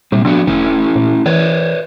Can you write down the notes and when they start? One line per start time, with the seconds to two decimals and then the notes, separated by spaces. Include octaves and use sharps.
0.12 A#2 G3 C4
0.25 F3 B3 D4 F#4
0.47 E1 A3 C#4 E4
0.96 A#2
1.26 E3 B4 C#5 D5